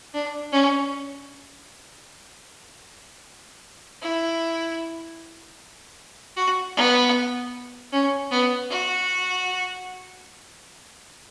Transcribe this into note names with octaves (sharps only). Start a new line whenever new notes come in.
D4
C#4
E4
F#4
B3
C#4
B3
F#4